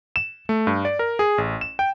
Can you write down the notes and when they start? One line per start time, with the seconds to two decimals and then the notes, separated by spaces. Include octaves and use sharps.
0.16 E7
0.49 A3
0.67 G2
0.85 D5
0.99 A#4
1.19 G#4
1.38 A1
1.61 E7
1.79 G5